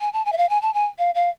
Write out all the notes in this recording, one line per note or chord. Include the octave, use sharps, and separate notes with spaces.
G#5
A5
G#5
E5
F5
G#5
A5
G#5
F5
F5